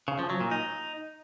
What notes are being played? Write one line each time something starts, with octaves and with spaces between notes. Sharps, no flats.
C#3
F3
F#3
A#2
D#4